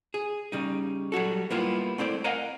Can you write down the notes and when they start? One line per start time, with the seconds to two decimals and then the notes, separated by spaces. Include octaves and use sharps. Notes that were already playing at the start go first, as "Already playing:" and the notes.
0.14 G#4
0.52 C#3 G3 D#4
1.12 F#3 G3 F#4 A4
1.50 G3 A#3 B3 E4 F4
1.98 A3 C4 E4 D5
2.24 A#4 D#5 F5 F#5 G#5 A#5